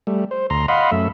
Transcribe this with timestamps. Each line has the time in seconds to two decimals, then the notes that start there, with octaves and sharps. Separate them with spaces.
0.07 G3 A3
0.31 C5
0.50 D2 A#5 C6
0.68 D#5 F5 F#5 B5 C6
0.92 F#2 A3 E5